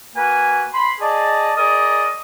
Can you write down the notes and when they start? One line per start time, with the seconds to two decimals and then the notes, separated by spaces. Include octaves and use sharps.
0.16 A#3 F#4 B4 G#5
0.73 B5 C6
1.00 G#4 D5 D#5 A5
1.57 G#4 A#4 D5 D#5